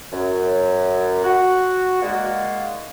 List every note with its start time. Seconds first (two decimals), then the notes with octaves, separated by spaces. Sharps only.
0.12 F#2
1.24 F#4
2.02 G#3 A#3 D#4 F#4 D5 F5